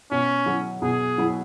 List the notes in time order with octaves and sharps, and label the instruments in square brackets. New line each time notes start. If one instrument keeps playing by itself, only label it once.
[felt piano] B2 [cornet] C#4
[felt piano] F#3 E4
[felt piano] B2 [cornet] G#4
[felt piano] F#3 E4